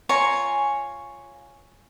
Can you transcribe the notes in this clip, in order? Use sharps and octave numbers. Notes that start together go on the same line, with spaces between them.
F4 C#5 G#5 A#5